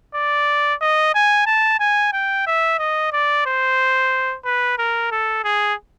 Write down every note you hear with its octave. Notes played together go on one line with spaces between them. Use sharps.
D5
D#5
G#5
A5
G#5
G5
E5
D#5
D5
C5
B4
A#4
A4
G#4